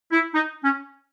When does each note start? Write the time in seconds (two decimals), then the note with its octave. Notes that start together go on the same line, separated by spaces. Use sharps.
0.12 E4
0.34 D#4
0.64 C#4